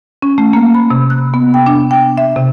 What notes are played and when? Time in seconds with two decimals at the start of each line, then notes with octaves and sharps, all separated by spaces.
0.22 C#4
0.38 A3
0.53 A#3
0.75 B5
0.90 C3
1.10 F#6
1.34 B3
1.54 G5
1.66 D4
1.91 G5
2.18 E5
2.36 C3